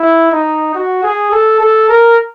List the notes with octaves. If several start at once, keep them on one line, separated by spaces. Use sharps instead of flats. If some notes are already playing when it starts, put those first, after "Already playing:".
Already playing: E4
D#4
F#4
G#4
A4
A4
A#4